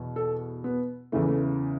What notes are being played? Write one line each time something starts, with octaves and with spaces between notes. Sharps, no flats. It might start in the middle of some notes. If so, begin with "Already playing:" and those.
Already playing: E2 B2
A4
B3
E2 C#3 E3 A3
A3